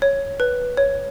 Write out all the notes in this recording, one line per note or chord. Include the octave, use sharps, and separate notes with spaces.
C#5
B4
C#5